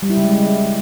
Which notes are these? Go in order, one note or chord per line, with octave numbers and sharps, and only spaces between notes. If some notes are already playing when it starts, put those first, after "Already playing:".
G3
E4
C#3
G#3